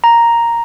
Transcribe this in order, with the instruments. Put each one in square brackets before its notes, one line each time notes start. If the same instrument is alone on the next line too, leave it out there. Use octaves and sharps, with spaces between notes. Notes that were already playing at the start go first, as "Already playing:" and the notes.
[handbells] A#5